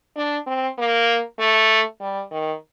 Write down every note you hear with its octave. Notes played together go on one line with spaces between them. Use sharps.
D4
C4
A#3
A3
G3
D#3